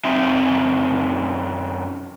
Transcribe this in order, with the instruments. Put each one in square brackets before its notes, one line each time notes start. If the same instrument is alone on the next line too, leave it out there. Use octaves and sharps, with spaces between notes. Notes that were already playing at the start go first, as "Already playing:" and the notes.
[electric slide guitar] F#2 C4 D#4 E5